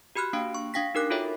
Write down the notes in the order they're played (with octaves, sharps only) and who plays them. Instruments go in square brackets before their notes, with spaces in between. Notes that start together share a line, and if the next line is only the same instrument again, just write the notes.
[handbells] F#4 G4 B5 F6 F#6
A#3 D4 F5 G5 D7
C#6
D4 F5 G5 A#6 B6
D#4 G4 A#4 D6 F#6
F4 F#4 A4 C#5 E5 G5